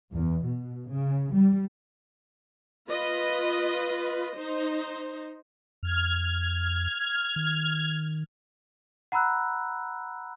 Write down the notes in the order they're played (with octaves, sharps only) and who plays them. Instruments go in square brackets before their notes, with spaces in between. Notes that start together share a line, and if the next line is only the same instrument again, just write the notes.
[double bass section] E2
B2
C#3
G3
[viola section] F4 B4 D#5
D#4 C5
[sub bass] F2 [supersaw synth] F6 G#6
[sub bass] D#3
[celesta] F#5 A#5 B5 E6 F#6